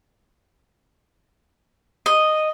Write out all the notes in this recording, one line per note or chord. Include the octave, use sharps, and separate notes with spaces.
D#5